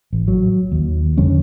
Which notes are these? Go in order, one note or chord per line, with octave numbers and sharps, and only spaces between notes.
A1
F#3
D#2
F2 D3 G3 C#4